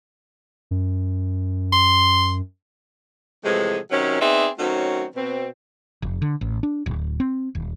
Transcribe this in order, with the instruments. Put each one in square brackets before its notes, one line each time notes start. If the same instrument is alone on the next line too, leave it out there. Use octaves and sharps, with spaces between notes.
[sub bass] F#2
[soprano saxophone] C6
[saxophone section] A2 C3 E3 F3 G#3 G#4
C3 D#3 F#3 C#4
B3 C4 D#4 G#4 D5 E5
D#3 F#3 A3 C4 C#4 F#4
B2 C4
[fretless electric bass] F1
D3
A1
D4
D1
C4
D#1